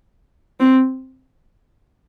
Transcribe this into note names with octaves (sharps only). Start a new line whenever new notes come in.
C4